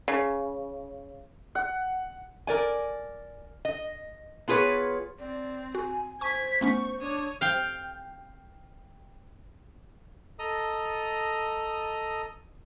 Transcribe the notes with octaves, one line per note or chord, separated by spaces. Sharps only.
C#3
F#5
A#4 D5 G#5
D#5
B3 F4 G#4 B4 C#5
C4 D5
F#4 G#5
C5 G#5 C#6 G#6 B6
A3 B3 C#4 C#6
D4 C#5 D#6
F5 G5
A4 D#5 A#5 D#6